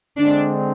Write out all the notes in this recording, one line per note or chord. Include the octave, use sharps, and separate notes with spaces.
D3 G#3 C4 D4